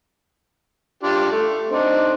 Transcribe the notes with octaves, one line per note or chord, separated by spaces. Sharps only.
D4 F4 G4
A3
C4 D4 D#4